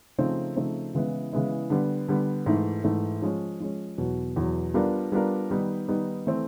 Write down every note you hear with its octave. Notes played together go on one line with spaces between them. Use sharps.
C#3 F3 A3 C4 D#4
C#3 F3 A3 C4 D#4
C#3 E3 G#3 B3 E4
C#3 E3 G#3 B3 E4
D3 G3 B3
D3 G3 B3
G#2 E3 A3
G#2 E3 A3
F3 G#3 C#4
F3 G#3 C#4
E2 B2 F#3
E2 B2 F#3
G3 B3 D4 F4 A#4
G3 B3 D4 F4 A#4
D#3 G3 B3 D#4
D#3 G3 B3 D#4
E3 A3 C4